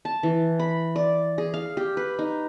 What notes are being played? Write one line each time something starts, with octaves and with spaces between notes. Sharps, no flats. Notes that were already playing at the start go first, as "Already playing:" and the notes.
A5
E3
B5
D5
G#4
F5
G4
B4
D#4